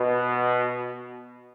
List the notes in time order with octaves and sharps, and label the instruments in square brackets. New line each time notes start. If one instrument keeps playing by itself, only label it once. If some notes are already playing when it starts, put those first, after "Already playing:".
Already playing: [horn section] B2